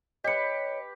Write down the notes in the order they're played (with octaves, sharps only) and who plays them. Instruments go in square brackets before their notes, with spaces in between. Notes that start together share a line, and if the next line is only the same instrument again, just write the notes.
[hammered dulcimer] G4 B4 [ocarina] C#5 [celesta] D#5 C#7